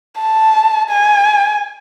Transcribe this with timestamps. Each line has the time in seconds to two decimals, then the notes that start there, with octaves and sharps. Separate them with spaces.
0.20 A5
0.90 G#5